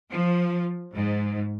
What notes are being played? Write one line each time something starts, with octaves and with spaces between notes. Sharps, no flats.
F3
G#2